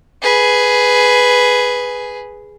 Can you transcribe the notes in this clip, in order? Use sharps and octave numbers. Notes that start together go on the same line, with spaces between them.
G#4 B4